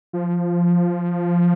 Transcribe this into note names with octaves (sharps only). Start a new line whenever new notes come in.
F3